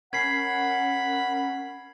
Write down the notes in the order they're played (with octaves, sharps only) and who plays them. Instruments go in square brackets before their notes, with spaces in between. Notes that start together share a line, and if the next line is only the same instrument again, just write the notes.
[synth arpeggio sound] C#4 A#4 [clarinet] F#5 [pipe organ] B5 [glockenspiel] G#6 C7